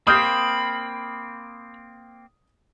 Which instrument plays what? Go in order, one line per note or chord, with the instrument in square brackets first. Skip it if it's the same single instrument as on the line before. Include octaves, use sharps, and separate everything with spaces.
[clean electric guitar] A#3 C4 [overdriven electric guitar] B5 [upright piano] D#6 F6 G6